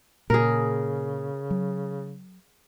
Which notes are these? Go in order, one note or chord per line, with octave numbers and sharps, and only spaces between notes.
A#2 C#3 G#4 A#4
F#3